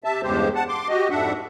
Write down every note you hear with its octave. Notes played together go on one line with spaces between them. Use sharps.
C3 E5 A5
E2 G2 C#3 G#3 G4 C5
F#5 A5
C6 D6
F#4 G4 D#5
F2 G#2 D4 E5 F#5